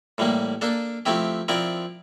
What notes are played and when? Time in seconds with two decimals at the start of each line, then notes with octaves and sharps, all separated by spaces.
0.18 A2 E3 G3 A#3
0.61 A#3 D4 A4
1.06 F3 A3 C4 E4 G4
1.48 F3 C4 E4 A#4 D5